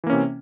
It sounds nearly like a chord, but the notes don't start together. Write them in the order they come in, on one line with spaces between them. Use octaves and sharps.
E3 A#3 C#4 C3